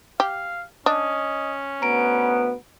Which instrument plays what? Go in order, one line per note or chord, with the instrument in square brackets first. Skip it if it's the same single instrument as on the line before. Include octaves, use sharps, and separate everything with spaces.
[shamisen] G4 [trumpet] F5
[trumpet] C#4 [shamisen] D4 [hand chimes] D#5 D#6
[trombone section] D2 B3 [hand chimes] A#5 D7